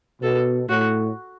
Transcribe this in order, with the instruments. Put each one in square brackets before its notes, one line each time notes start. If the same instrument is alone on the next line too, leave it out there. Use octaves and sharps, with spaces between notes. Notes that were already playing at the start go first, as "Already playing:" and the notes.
[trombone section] B2 [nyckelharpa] A4
[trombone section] A2 [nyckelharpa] F#4